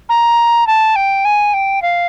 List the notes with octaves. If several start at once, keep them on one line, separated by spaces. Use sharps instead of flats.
A#5
A5
G5
G#5
G5
F5